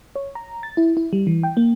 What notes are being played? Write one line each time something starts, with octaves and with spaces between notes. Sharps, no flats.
C#5
A#5
A6
E4
E4
G3
E3
G5
A#3